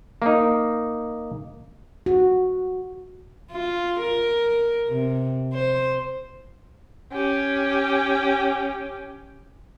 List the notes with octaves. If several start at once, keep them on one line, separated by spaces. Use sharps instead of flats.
A#3 D#4
F#4
F4
A#4
C3
C5
C#4 G4